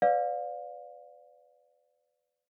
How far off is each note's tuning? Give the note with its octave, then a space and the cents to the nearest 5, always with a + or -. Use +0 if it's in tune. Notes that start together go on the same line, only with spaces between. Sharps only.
B4 +35 D5 -5 F5 +30